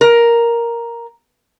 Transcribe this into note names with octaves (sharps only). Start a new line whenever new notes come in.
A#4